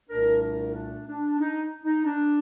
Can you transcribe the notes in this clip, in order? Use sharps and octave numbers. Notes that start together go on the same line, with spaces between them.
C2 A#2 A3 D4 A#4
A#4
D4
D4
D#4
D#4
D4